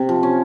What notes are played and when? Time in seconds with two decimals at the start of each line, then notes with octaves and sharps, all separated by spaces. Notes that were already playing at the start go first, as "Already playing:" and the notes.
Already playing: C3
0.09 F3
0.23 C#4